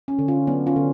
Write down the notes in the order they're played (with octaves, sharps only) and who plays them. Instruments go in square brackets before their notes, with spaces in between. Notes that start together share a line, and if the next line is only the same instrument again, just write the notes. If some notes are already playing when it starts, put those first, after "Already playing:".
[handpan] C#4
D3
C#4 F4
F#3 B3 D4
C#4 F4
D3